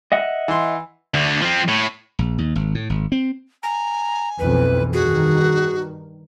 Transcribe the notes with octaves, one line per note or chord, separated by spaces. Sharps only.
D#5 E5 F#5
E3 C6
D2 D3
F3 C4
A2
A#1
D#2
G#1
A2
G#1
C4
G#5 A#5
B1 F2 E3 B4
G2 D#3 F#4 G#4